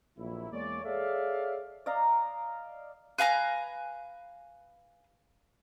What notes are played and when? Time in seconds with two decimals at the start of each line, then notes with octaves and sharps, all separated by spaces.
0.18 A#1 F2 A#2 F#3 E4
0.52 E2 G#3 A#3 C#5 D5
0.84 G#4 A4 C#5 D5 E5 F5
1.86 D5 D#5 F5 A#5
3.18 B4 F5 G#5 A#5